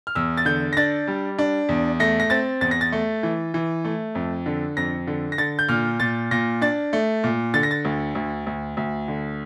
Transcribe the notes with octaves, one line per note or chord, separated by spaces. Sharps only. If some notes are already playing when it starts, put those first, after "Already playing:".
F6
E2 E6
A6
D3 G6
A#6
D4 A6
G3
D4
E2
A3 A#6
A#6
C4 A6
E2 A6
A#6
A6
A3
E3
E3
A3
F2
D3
F2 A#6
D3
A#6
D3 A6
G6
A#2 F6
A#2 A6
A#2 A#6
D4 A6
A3
A#2
D3 A6
A#6
A6
D2
D2
D2
D2
D3